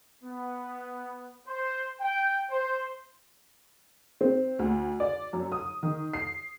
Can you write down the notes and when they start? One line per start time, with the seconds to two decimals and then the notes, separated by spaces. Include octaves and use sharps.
0.23 B3
1.47 C5
2.01 G5
2.50 C5
4.21 C4
4.59 D2
5.00 D5
5.33 F#2
5.52 D#6
5.83 D#3
6.14 C7